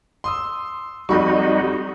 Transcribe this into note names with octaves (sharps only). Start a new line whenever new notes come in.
C6 D#6 E6
F2 G3 D#4 F#4 B5 C#6